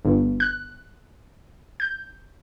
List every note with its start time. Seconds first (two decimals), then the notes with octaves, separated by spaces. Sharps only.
0.05 G1
0.40 F#6
1.80 G6